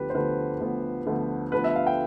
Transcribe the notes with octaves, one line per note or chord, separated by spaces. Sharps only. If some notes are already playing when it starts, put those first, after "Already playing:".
Already playing: D2 D3 F3 B3 G4 B4
C5
D2 D3 F3 B3 B4
D2 D3 F3 B3
D2 D3 F3 B3
D2 D3 F3 B3 B4
E5
F5
G5